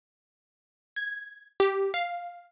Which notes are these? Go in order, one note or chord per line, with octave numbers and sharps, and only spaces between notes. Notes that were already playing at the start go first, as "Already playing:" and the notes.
G#6
G4
F5